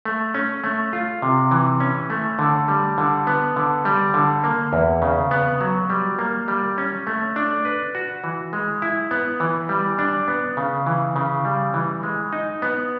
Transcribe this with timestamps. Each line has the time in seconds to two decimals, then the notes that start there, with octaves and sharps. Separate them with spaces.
0.05 A3
0.34 C#4
0.64 A3
0.93 F4
1.22 C3
1.51 E3
1.80 C#4
2.10 A3
2.39 D3
2.68 G3
2.98 D3
3.27 B3
3.56 D3
3.85 G3
4.14 D3
4.44 A#3
4.73 E2
5.02 C#3
5.31 B3
5.61 F#3
5.90 G3
6.19 A#3
6.48 G3
6.78 C#4
7.07 A3
7.36 D4
7.65 B4
7.95 F#4
8.24 E3
8.53 G#3
8.82 E4
9.11 B3
9.40 E3
9.69 G3
9.99 D4
10.28 B3
10.57 C#3
10.86 E3
11.16 C#3
11.45 G3
11.74 E3
12.03 G#3
12.33 D#4
12.62 B3